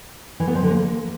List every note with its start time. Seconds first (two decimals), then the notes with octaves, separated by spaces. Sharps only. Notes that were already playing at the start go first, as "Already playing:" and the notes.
0.40 E3
0.47 B3
0.55 F3
0.63 D3
0.70 A#3